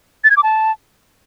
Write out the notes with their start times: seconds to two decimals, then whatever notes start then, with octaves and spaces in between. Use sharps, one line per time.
0.24 A6
0.30 G#6
0.37 D6
0.43 A5